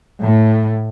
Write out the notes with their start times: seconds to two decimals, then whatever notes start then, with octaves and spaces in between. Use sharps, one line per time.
0.24 A2